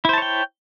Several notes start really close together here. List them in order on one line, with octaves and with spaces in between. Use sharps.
E4 C5 A5 C#5 G5